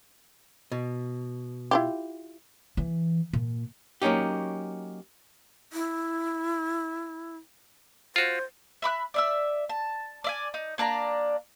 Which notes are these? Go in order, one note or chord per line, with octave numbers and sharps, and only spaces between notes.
B2
E4 F4 G4
E3
A#2
F#3 A#3 C#4 D#4 G4
E4
F4 F#4 C5
E5 B5 D6 F#6
D5 E5 E6
A5
D5 E5 G#5
D#4
A#3 D4 D5 A#5